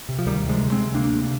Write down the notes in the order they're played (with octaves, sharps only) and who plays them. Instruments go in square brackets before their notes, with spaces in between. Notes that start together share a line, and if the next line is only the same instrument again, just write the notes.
[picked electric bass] C3
F3
D2 D#3 G3
C3
F3 G#3
D2
G#3 C4
C3
D2 A#3 D4
C3